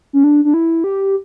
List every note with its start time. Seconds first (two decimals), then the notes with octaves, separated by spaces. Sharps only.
0.13 C#4
0.24 D4
0.45 D4
0.54 E4
0.84 G4